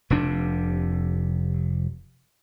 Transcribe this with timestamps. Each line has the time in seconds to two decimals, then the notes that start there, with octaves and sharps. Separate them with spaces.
0.10 F1 C3 D4